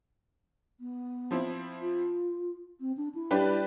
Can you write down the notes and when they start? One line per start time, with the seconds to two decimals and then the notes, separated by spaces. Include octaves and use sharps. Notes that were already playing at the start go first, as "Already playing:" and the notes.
0.80 B3
1.31 F3 C4 E4
1.81 F4
2.80 C4
2.97 D4
3.15 E4
3.31 G3 D4 G4 B4